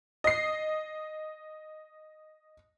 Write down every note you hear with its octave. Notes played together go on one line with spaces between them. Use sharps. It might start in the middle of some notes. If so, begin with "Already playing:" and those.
D#5 C7